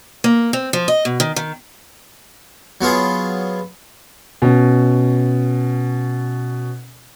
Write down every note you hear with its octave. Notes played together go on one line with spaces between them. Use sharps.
A#3
C4
F3
D#5
B2
D#3
D#3
F#3 B3 F4 G#4
B2 C#4